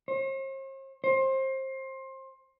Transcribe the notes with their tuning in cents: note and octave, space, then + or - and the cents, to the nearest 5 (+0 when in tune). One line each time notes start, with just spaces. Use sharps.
C5 +45
C5 +25